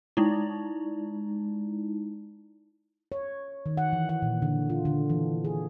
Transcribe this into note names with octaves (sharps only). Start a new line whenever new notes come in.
G#3 D#4 E4
C#5
D#3
F#5
E3
F#5
A#2
D3
F4
D3
E3
G#4